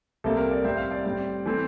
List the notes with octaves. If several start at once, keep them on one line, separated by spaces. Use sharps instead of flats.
C2 C3 G3 A#3 A4
A#4
D5
A2 G3 C4 E5
F5
D5
A2 G3 C4
E3 A3 C4